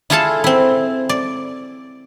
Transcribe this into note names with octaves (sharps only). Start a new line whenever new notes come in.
E4 F4 G#4 A4 F5 A5
C4 E4
D5